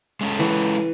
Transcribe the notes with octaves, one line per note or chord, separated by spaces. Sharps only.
G#3 C#4 A4
E3